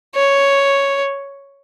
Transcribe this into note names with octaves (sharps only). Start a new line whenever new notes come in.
C#5